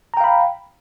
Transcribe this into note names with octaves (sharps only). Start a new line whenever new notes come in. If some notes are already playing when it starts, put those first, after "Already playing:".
F5 G5 A#5 B5